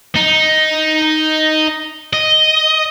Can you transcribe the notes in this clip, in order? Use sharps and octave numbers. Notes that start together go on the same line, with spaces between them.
D#4
D#5